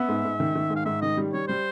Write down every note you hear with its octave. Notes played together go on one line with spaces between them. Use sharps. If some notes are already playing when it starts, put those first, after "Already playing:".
Already playing: B3 E5
G#2
G#2
D#3
D#3
G#2
F5
G#2 E5
D#3 D#5
G3
G3 C#5
G3 C5